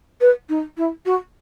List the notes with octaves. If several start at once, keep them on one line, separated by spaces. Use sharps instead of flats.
B4
D#4
E4
F#4